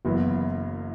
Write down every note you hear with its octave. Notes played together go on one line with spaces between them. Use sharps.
F#1 F#2 E3 B3 E4